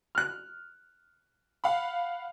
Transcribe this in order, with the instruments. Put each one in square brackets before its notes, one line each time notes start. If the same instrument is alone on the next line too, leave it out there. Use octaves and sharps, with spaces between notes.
[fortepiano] F6 F#6
[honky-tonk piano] F5 F#5 B5